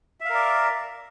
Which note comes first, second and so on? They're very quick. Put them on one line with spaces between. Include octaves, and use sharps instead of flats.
E5 F5 A#4 D5